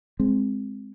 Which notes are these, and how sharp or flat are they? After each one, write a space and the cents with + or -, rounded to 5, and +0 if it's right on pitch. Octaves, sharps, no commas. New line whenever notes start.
G#3 +0 C4 +0